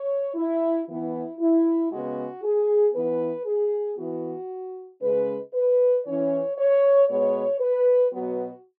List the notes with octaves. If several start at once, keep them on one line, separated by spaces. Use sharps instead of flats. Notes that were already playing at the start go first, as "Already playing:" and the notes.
Already playing: C#5
E4
E3 B3 E4
E4
C#3 G#3 B3 F#4
G#4
E3 B3 B4
G#4
E3 B3 F#4
C#3 G#3 C#4 B4
B4
E3 C#4 C#5
C#5
B2 G#3 B3 C#5
B4
B2 F#3 B3 F#4